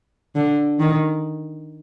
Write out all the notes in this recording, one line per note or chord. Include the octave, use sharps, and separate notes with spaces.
D3
D#3